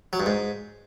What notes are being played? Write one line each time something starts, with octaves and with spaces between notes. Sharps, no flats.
F#3
G2
G#2